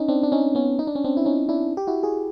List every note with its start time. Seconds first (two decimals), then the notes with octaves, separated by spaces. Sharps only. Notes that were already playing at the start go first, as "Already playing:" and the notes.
Already playing: C#4 D#4
0.08 C4 D4
0.23 D4
0.32 C#4 D#4
0.55 B3 C#4
0.79 D#4
0.87 D4
0.95 C#4
1.04 C4 D4
1.17 E4
1.25 C#4 D#4
1.49 D4 E4
1.77 G4
1.87 E4 F#4
2.03 F#4 G#4